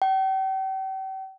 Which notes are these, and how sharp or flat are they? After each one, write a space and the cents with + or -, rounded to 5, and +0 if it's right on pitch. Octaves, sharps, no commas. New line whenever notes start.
G5 -40